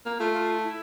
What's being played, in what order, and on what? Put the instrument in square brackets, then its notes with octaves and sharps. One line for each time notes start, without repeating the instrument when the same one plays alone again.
[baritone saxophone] A#3
[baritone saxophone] A3 [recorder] F4
[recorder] F4
E4